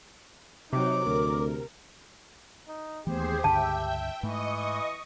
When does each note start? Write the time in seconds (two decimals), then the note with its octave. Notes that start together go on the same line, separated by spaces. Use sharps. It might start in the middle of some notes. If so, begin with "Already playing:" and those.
0.73 C3 F#3 D#4 D6
1.06 D2 A#4
2.68 D#4
3.07 D#2 E3 A3 B3 G4 G#4 C5
3.44 C#2 G2 D3 E5 G5 A5
4.23 G#2 E3 A3 D#5 C#6 D#6